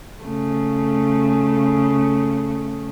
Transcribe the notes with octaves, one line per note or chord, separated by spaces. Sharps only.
C#3 A3